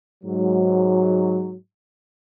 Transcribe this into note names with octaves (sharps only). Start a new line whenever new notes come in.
G#2 F#3